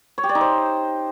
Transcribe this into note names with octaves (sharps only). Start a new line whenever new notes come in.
C#5
G4
D5
D#4
C5